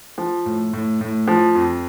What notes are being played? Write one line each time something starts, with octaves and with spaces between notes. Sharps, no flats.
F3
A2
A2
A2
F3
F2